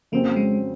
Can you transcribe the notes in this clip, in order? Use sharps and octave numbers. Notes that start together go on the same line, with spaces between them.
F2 C#3 F#3 A#3 C4
G#3